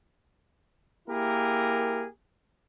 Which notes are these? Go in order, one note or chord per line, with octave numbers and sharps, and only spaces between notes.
A#3 E4 G4 G#4 A#4